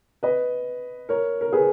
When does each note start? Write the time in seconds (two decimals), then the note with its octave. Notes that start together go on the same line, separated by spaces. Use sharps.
0.23 B4 D#5
1.09 A#4 C#5
1.41 A#4
1.52 G#4 B4